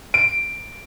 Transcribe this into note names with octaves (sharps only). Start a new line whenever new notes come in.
D7